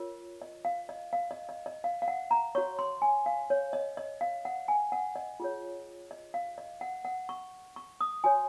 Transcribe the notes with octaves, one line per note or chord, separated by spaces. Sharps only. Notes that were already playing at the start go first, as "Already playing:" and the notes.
Already playing: F4 A#4 C#5
D#5
F5
D#5
F5
D#5
D#5
D#5
F5
F5
F#5
A#5
F#4 C#5 C#6
C6
G#5
F5
C#5
D#5
D#5
F5
F#5
G#5
F#5
D#5
F4 G#4 C#5
D#5
F5
D#5
F#5
F#5
C#6
C#6
D#6
F#4 C#5 G#5